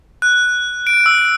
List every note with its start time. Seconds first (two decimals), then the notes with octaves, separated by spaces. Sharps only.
0.22 F#6
0.87 D7
1.06 E6